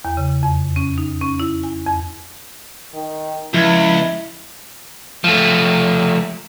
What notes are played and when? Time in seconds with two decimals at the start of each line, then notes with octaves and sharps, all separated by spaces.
0.05 E2
0.17 C#3
0.43 F2
0.76 C#4
0.98 D#4
1.21 C#4
1.40 E4
1.64 G#5
1.86 F2
2.95 D#3
3.54 C#2 F3 E4 G#6
5.24 F3 A3